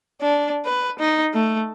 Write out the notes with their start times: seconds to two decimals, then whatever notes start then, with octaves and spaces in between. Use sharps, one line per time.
0.21 D4
0.65 B4
0.99 D#4
1.34 A3